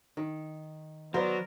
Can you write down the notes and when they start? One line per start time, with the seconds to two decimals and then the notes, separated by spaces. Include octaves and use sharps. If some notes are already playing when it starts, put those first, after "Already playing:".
0.17 D#3
1.14 F#3 B3 A#4 C5 D5